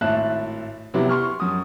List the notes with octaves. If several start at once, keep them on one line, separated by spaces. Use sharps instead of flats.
G#1 A2 E5 A5 F#6
C3 F#3 B3 E4 G4
C6 C#6 F6
F#2 D#6